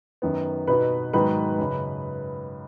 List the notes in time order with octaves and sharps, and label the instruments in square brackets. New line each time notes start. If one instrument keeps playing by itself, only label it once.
[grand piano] F#2 D#3 B3
[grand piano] B2 B3 D#4 F#4 [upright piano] B4
[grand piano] G#2 D#3 F#3 B3 [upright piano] B4
[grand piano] F#2 C#3 G#3